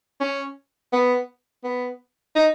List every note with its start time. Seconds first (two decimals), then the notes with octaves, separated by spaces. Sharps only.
0.21 C#4
0.93 B3
1.64 B3
2.36 D#4